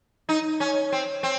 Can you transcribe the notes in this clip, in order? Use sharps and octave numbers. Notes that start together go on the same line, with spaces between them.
D#4
C#4
C4
C4